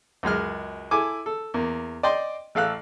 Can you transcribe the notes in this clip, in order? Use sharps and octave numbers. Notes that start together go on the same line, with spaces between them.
C#2 F#2 G#3 F6
E4 A4 G#5 D6
A4
E2 A#3
D5 D#5 G5 C6
A1 A4 F5 F#6